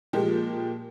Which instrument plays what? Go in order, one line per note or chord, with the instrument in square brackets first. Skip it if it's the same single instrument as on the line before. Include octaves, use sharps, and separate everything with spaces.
[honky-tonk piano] A#2 F3 G#3 A#3 G4